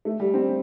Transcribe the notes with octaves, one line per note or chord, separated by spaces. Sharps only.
A3
G3
C4